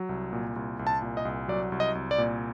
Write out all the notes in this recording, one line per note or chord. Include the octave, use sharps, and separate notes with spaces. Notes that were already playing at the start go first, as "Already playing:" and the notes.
Already playing: F#3
C2
A#2
C2
C2
A5
A#2
D#5
C2
F#3 D5
C2
D#5
C2
D5
A#2